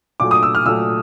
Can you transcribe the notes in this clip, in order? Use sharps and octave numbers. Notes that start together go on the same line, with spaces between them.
A#2 F#3 A3 D6
D#6
E6
F6
A#2 F#3 A3 E6